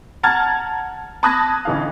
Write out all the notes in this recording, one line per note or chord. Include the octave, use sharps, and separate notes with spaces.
F#5 A5 A#5 F6 G#6 A6
A5 B5 D#6 F#6 G#6 A#6
A1 D2 E3 D#4 F5